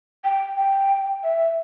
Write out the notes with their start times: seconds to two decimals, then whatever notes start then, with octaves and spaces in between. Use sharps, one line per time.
0.24 G5
0.57 G5
1.24 E5